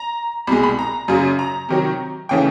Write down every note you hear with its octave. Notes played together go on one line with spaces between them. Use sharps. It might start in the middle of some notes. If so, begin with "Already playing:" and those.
Already playing: A#5
C2 B2 G#3 B5
B5
A#5
F#2 C#3 F#3
A#5
C3 D#3 F#3
C#3 E3 A3 C#4 G5